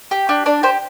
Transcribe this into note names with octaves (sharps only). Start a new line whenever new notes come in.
G4
D4
D4 D5
G4 C5